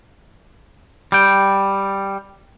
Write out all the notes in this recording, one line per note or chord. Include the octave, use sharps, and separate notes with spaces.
G3 G5